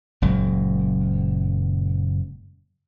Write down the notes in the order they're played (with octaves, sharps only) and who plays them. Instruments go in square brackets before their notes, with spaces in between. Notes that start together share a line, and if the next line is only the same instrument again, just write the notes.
[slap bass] F#1 F#2 A#2 G#3